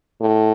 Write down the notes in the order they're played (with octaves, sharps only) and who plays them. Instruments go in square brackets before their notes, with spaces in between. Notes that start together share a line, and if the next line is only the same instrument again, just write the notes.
[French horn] A2